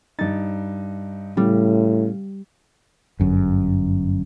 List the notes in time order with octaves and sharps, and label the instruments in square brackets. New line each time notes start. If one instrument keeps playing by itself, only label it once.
[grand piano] G2 D#4 [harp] A6
[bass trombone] A2 [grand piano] C#3 [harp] G3
[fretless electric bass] G1 F#2